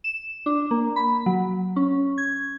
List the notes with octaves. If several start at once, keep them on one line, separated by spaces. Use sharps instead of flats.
E7
D4
A#3
B5
F#3
C#4
G#6